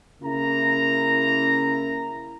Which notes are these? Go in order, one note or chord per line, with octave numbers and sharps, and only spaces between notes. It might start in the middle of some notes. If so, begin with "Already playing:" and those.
C#3 A#3 E4 A#5